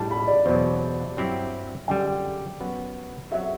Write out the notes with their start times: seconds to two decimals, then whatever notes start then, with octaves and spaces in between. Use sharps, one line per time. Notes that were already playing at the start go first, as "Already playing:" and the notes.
Already playing: A2 G3 D4 A5
0.11 B5
0.27 D5
0.46 E2 B2 F#3 C5
1.17 G2 F#3 C4 E4 G4
1.88 F#2 D3 G3 G5
2.60 F#2 F#3 B3 F#4 B4
3.31 F#3 C4 F#4 E5